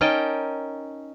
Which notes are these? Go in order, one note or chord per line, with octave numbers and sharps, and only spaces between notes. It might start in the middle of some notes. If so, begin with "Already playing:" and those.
C#4 D#4 A#4 D#5 G5 A5